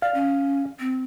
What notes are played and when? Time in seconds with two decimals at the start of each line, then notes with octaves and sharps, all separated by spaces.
0.02 D5 F5
0.14 C#4
0.79 C4